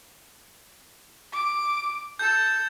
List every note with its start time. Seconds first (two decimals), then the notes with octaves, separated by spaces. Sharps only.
1.33 D6
2.19 A4 G6